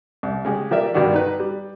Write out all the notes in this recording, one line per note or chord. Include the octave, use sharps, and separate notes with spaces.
C2
C#3 G#3 G4
F3 G4 A#4 D5 E5
G2 B2 D3 D#3 D4 F#4
D#4 B4
G3